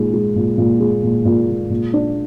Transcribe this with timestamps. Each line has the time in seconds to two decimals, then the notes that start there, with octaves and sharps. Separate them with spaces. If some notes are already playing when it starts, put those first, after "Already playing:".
Already playing: A#2 G#3 D#4
0.13 G#3
0.36 A#2
0.58 A#2
0.80 G#3
1.03 A#2
1.25 A#2
1.49 G#3
1.70 A#2
1.93 D4